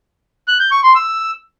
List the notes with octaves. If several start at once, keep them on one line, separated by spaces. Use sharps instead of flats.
F#6
G6
C#6
C6
E6